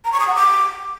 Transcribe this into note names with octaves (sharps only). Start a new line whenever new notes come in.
A#5
C#6
D#6
F#5
D6